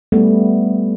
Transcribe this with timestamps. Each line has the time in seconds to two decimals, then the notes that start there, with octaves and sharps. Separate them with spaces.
0.12 G3 A3 B3